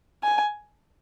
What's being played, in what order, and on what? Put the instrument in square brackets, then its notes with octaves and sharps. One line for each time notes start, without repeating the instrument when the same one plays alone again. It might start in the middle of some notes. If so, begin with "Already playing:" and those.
[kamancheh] G#5